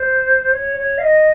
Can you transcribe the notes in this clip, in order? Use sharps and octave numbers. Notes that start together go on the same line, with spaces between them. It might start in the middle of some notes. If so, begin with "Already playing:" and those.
Already playing: C5
C#5
C#5
F5
D#5